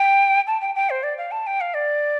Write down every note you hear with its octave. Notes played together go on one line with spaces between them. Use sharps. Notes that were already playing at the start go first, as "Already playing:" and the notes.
Already playing: G5
A5
G5
G5
C5
D5
F5
A5
G5
F5
D5